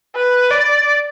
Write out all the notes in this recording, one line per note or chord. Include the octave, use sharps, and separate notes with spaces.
B4
D5